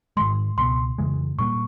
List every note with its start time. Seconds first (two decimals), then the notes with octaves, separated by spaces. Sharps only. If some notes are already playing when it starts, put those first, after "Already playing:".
0.17 G#2 D#3 G#3 C6
0.58 C#2 B2 G3 B3 C6
0.98 F2 C#3 E3 G#3
1.39 A#2 G3 A#3 C#6